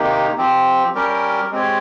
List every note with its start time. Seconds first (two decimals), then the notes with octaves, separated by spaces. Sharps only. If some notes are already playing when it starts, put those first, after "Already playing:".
Already playing: C3 D#3 A#3 D#4 G4
0.38 F3 C4 G4
0.95 G3 C#4 G4 A#4
1.51 G#3 C4 G4 C#5